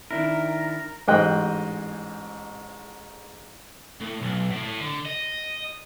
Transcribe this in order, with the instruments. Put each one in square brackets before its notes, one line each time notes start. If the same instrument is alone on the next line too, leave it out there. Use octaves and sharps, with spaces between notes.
[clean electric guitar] D#3 D4 E4 [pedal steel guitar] A#4
[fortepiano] A1 G#2 D#5 G5 F#6
[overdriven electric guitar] A2
B1
A2
A2
D3
D#5